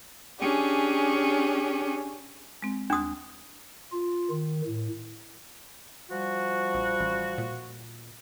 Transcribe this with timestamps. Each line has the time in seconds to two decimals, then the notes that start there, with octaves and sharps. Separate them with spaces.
0.39 C#4 D4 G4 G#4
2.62 G#3 C4
2.90 D#2 D4 C6 D#6 F#6
3.92 F4
4.30 D#3
4.66 A2
6.10 F3 G3 F#4
6.74 A#1
7.00 A1
7.38 A#2